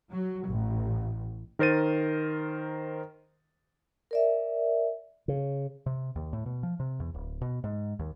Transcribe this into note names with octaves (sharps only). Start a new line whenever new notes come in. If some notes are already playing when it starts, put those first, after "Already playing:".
F#3
A1
D#3 A#4 C5 A6 D#7
A#4 D5 E5
C#3
C3
D#2
A2
B2
F3
C3
E2
D1
B2
G#2
D#2